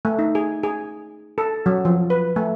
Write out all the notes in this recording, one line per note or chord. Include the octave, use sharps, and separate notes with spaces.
A3
D#4
G#4
G#4
A4
F#3
F3
B4
A3